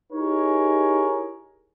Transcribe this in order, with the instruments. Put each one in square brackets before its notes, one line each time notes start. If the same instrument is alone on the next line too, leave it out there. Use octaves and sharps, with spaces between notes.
[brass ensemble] D#4 E4 G4 G#4 A#4 C#5